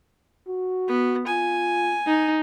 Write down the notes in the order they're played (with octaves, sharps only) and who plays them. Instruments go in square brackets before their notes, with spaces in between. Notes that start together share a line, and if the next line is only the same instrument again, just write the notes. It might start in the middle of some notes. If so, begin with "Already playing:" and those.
[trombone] F#4
[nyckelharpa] B3
[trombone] F4 [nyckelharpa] G#5
[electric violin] D#4